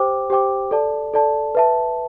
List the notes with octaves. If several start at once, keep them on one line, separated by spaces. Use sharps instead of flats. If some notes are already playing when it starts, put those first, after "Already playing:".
Already playing: G4 C5 G5 D6
G4 C5 G5 D6
A4 D5 A5
A4 D5 A5
B4 E5 A5